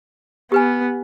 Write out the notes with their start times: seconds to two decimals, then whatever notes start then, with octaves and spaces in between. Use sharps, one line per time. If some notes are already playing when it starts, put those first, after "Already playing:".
0.52 B3 G4 B4 G#5